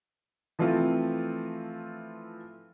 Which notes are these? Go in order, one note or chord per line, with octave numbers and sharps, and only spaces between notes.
E3 F3 A3 C4 F4